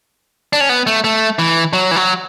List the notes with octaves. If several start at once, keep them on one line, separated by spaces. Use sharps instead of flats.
D4
C#4
B3
A3
A3
E3
F#3
E3
F#3